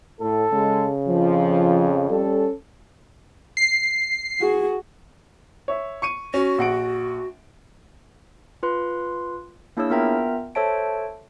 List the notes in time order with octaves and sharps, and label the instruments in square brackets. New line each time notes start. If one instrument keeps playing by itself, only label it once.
[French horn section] A2 [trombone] A4
[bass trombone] C#3 [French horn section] G#3
[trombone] F2 [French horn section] F3
[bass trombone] G3 [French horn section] C#4 A4
[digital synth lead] C7
[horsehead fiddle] F#4 G#4
[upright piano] C#5 E5
C#6 C#7 D#7
[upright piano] C#4 [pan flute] F#4
[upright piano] A#1 F#5 D7
[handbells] F4 B4 C6
A#3 D4 E4 G#4 C#5 E6
B3 F4 A#4 E5 G5 A#5
A4 C5 C#5 E5 A5 D7